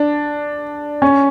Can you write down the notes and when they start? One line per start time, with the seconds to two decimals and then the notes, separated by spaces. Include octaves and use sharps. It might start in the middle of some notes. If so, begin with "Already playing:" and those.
Already playing: D4
1.02 C#4